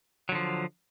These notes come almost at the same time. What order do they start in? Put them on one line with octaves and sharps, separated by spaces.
F#3 D3 F3